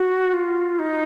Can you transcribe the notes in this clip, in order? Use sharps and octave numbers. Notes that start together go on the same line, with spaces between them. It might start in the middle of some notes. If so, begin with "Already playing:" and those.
Already playing: F#4
F4
D#4